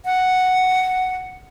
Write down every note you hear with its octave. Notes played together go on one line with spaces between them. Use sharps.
F#5